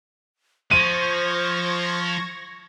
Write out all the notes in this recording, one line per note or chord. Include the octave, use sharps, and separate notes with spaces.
F3 C5 C#6 G#6 A#6 D#7